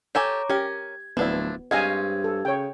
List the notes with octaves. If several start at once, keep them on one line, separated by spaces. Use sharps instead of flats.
G4 A4 C#5 G#5 A#5 D6
C#4 G4 A#4 G#6
D1 F3 B3 D4 E4
G2 G#3 C4 C#4 D#5 F5 G#5 G#6
A4
C#3 C#5 G5